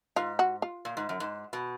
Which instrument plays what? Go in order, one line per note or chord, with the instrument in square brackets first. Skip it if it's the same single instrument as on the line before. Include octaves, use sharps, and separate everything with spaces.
[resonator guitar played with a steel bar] G#2 [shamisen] F4
[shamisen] F#4
F4
[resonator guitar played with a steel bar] A#2
G#2
F#2
G#2
B2